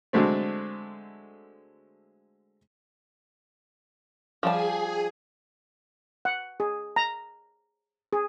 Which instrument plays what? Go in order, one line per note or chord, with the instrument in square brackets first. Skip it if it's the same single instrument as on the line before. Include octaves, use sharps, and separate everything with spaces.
[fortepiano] D3 F#3 G#3 A3 C4
[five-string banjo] F3 G3 A5 [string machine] G#4 G#5
[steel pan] F#5
G#4
A#5
G#4